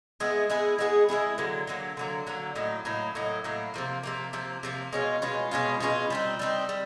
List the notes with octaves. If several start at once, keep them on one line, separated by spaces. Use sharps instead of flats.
G#3 B3 E4 G#4
G#3 B3 E4 G#4
G#3 B3 E4 G#4
G#3 B3 E4 G#4
D3 F#3 A#3
D3 F#3 A#3
D3 F#3 A#3
D3 F#3 A#3
A2 F#3 A#3 D#4
A2 F#3 A#3 D#4
A2 F#3 A#3 D#4
A2 F#3 A#3 D#4
C3 F3 A#3
C3 F3 A#3
C3 F3 A#3
C3 F3 A#3
B2 G#3 C#4 F4
B2 G#3 C#4 F4
B2 G#3 C#4 F4
B2 G#3 C#4 F4
G3 C4 D#4
G3 C4 D#4
G3